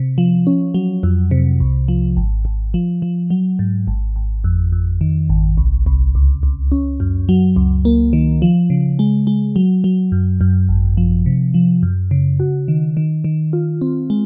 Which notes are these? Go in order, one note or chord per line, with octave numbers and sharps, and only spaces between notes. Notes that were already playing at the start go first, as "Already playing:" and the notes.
Already playing: C3
F3
C#4
F#3
F2
C3
C2
F3
G#1
G#1
F3
F3
F#3
G#2
G#1
G#1
F2
F2
D#3
G#1
C2
C2
C#2
C#2
C#4
F#2
F#3
C#2
A#3
D#3
F3
C#3
G#3
G#3
F#3
F#3
F#2
F#2
G#1
F3
C3
F3
F#2
C#3
F#4
D#3
D#3
D#3
F4
C4
G#3